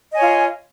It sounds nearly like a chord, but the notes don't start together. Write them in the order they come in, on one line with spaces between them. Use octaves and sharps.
D#5 G#5 C#5 F4